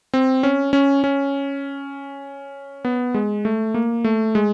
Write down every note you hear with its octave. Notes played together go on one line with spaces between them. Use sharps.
C4
C#4
C#4
C#4
B3
G#3
A3
A#3
A3
G#3